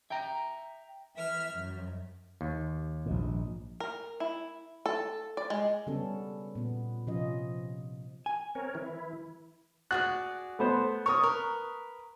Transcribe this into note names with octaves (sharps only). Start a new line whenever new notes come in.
E5 G5 A#5
E3 E5 F6
F#2
D#2
A#1 G#2
A#4
E4
A4
D5
G#3
C#3 G3 B3 C#4 A4
A#2 B3
C3 F3 C#4 F4 D#5
G#5
C4 A#4 C#5
E3 E4
F#4 G#4 D5 F#6
A3 B3 C5
A#4 C#5 C#6 D#6
A#4 B4